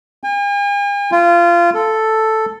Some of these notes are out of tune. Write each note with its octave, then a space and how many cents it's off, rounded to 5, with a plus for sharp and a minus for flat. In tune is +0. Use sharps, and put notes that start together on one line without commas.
G#5 -45
F4 -20
A4 +0